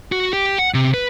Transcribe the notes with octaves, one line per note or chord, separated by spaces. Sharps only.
F#4
G4
F#5
C3
B4